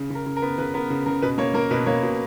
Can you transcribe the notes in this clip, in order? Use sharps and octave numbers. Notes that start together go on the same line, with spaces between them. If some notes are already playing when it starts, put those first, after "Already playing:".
Already playing: C#3
C#3 A#4
C#3
A#4
B3
C#3 B4
B3 A#4
C#3
C#3 A#4
B2 B4
A#3 C#5
A#3 A#4
B2 B4
A#3 C#5
B2